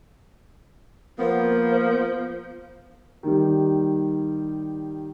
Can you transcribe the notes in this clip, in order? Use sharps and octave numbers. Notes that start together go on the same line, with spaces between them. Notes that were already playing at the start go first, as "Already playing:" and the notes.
F3 A#3 B3 C5
D#3 G3